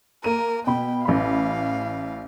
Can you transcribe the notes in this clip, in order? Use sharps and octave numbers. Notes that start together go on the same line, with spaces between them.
A#3 A#4 D#7
B2 G5 B5
A1 F5 B5